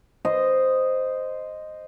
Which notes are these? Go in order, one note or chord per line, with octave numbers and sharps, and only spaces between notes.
C5 D#5 C6